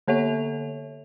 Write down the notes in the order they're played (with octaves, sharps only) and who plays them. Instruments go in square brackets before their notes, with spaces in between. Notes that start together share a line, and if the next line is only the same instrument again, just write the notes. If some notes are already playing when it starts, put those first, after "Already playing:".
[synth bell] D3 A#3 A4 C#5 E5 F7